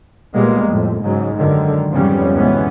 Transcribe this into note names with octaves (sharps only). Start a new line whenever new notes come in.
A#2 G3 G#3 A#3 B3
F2 A2
G#2 C#3 F#3
F#2 D3 D#3 G#3
F2 G#2 C#3 G3 B3 C#4
D2 B2 E3 G#3 B3 C#4